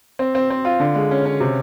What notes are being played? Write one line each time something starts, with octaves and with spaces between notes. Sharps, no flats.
C4
C4
C4
F4
D3
G#3
C#4
C#4
C3